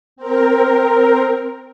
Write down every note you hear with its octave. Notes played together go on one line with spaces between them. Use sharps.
C4 A#4